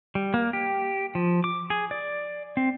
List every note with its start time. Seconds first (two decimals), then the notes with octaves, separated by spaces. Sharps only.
0.15 G3
0.34 A#3
0.53 G4
1.15 F3
1.44 D6
1.70 G#4
1.91 D5
2.57 C4